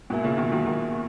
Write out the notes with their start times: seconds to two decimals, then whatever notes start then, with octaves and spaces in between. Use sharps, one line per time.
0.10 G#2 B2 A#3 E4 A#4 E5 G#5
0.24 A#2 C#3
0.37 B2 D#3
0.52 D#3 F#3
0.65 D#3 F#3